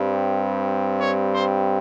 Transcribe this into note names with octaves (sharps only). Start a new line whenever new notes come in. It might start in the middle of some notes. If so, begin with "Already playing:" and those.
Already playing: G2 G3 C4
C#5
C5